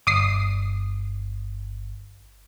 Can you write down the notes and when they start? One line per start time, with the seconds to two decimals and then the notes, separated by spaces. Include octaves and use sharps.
0.07 G1 D6 D#6 C7